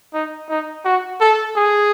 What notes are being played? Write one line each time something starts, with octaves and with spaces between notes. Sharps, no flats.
D#4
D#4
F#4
A4
G#4